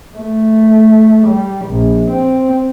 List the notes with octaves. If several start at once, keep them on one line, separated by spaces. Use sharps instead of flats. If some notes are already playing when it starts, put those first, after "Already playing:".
A3
G3
A#1
C4